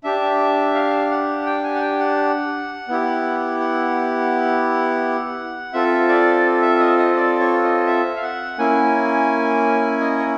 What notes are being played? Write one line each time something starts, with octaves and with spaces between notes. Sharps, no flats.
D4 G4 E5
F5
F#5
G5
G#5
F#5
G5
F#5
B3 E4 G4
F#5
C4 F4 A4 E5
D5
E5
D#5
D#5
D5
C#5
D#5
E5
F5
F#5
A#3 C#4 E4 G#5
D#5
C#5